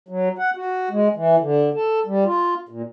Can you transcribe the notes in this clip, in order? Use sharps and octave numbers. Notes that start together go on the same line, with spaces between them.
F#3
F#5
F#4
G#3
E3
D3
A4
G3
F4
A#2